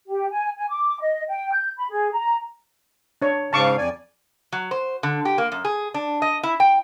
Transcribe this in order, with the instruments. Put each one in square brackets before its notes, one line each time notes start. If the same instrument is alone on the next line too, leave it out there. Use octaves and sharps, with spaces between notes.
[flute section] G4
G#5
G#5
D6
D#5
G5
G6
B5
G#4
A#5
[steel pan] D4 C#5
[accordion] G#2 C#3 F5 [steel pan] A5 C#6 D6
[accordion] F2 D5 G#5
[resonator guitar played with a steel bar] F#3
C5
D3
G4
A#3
F#2
G#4
D4
D#5
E4
G5